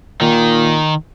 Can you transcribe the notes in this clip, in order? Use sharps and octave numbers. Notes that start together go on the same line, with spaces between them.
A#2 D#3